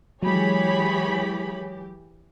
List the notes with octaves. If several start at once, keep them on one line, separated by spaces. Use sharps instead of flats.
E3 F#3 G#3 G4 G#4 C#5 B5